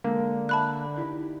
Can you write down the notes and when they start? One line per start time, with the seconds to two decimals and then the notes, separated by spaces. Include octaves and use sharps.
0.04 D3 G#3 A#3
0.49 D5 E5 A5 B5 F#6
0.96 D#4 E4 G4